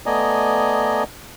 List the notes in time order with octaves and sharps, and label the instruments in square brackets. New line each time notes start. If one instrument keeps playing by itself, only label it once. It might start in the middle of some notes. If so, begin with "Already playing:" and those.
[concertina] A3 B3 D5 D#5 G#5 A#5